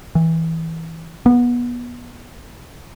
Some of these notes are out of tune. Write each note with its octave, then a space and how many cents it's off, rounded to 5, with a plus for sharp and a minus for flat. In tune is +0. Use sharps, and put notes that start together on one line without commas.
E3 -15
B3 -25